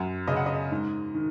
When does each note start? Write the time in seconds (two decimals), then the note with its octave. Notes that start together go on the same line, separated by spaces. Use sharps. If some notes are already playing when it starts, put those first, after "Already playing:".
Already playing: F#2 F#5
0.28 C#3 D#5
0.37 F#5
0.46 D#5
0.71 G#2
1.14 D#3